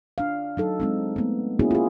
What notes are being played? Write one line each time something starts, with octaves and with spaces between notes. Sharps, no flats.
D4 F5
F#3 D#4 A4
G#3 C4 D#4
A3 B3
A#3 B3 C#4 E4 F#4 G#4
F4 G#4